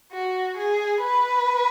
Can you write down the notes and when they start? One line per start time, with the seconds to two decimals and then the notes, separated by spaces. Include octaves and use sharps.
0.12 F#4
0.57 G#4
1.02 B4